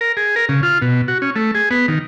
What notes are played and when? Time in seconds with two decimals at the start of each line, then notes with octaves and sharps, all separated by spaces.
0.01 A#4
0.17 G#4
0.36 A#4
0.49 C#3
0.63 F4
0.82 B2
1.08 F#4
1.22 C#4
1.36 A3
1.55 G#4
1.71 B3
1.88 D#3